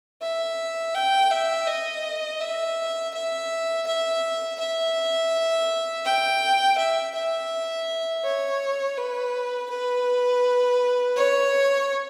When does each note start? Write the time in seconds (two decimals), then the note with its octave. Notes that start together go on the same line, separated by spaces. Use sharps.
0.22 E5
0.95 G5
1.31 E5
1.67 D#5
2.41 E5
3.14 E5
3.87 E5
4.60 E5
6.05 G5
6.78 E5
7.15 E5
8.24 C#5
8.97 B4
9.70 B4
11.16 C#5